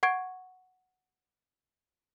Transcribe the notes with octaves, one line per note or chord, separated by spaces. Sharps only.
F#5 C#6 G#6 D7